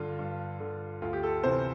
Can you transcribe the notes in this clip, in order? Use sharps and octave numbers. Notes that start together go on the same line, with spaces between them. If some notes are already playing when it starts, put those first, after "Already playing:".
Already playing: G2 D3 F4
G2
D3
D2 F4
G4
A4
C3 E3 C5